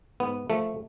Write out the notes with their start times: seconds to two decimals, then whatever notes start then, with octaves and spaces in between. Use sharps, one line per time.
0.20 G#2 B3
0.50 F3 A3